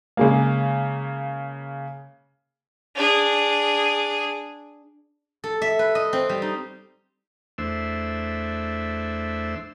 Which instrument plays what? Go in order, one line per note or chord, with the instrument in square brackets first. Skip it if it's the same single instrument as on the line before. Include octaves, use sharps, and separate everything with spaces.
[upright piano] C#3 G#3 A#3
[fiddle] D4 G#4
[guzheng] A4
E5
B4
D#5
C4
G3
D#4
[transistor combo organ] E2 A3 D4 C5 E5 E6